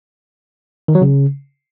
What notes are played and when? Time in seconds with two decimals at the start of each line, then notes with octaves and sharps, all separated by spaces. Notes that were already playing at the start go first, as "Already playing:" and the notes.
0.88 D#3
0.95 F#3
1.02 C#3